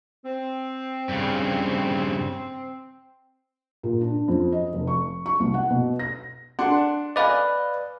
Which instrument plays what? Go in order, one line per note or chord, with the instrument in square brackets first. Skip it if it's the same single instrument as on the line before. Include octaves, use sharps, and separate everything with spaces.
[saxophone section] C4
[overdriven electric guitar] G2 C#3
[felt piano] A#2
D4
F2
D#5
F1
C#6
C#6
C2
F#5
B2
A#6
[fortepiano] D4 F#5 C6
[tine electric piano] B4 D5 [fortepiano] D#5 F5 G#5